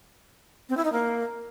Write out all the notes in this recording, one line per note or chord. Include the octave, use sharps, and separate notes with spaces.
C4
E4
D#4
A#3